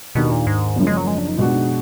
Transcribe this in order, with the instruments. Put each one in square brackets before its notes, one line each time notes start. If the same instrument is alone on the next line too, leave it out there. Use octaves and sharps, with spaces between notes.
[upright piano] D#2 D#3 A#3 D4 [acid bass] B2
[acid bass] A#2
G#2
[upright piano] F#1 F#2 F3
[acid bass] G#3
F#3
G#3
D4
D#4
[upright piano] B2 G#3 D4 F#4 [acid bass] F4
[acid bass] D#4